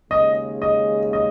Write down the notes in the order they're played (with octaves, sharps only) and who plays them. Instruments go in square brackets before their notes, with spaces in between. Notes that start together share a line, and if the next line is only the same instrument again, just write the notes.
[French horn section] D#2 C#3 G#3 [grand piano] D#5
[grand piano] D#5
D#5